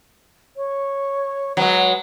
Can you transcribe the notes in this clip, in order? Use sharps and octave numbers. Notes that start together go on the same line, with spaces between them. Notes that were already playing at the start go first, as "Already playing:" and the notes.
C#5
F#3 G#3 B4